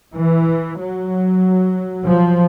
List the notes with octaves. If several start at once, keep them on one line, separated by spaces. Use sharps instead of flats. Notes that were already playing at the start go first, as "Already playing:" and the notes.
E3
F#3
F3